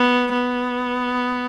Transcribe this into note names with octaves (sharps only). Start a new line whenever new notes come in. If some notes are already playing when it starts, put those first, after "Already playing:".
Already playing: B3
B3